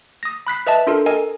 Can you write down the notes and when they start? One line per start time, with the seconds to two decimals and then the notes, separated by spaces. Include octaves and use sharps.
0.23 D#6 A#6
0.47 B5 F#6 B6 C7
0.67 B4 D#5 E5 A5
0.87 D4 F4 A4 A#4
1.06 A4 A#4 D#5 G#5